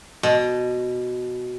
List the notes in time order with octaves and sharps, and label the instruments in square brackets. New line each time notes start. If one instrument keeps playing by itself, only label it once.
[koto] B2